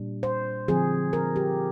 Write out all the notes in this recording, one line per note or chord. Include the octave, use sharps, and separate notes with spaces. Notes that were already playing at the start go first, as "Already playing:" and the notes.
Already playing: A#2 G3 D4
C5
D3 F3 C4 G#4
A#4
G4